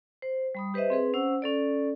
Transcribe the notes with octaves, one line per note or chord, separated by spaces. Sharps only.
C5
G3 B5 D#6
G4 B4 C5 D#5 E5
C4 G#4 B4
C#4 C5 F#5 E6
C#4 A4 D5